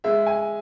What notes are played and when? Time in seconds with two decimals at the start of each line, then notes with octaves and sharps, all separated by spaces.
0.04 G#3 E5
0.26 G#5